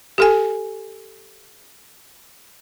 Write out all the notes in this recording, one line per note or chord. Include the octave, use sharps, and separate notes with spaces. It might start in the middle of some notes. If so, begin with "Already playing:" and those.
G4 A4 G#5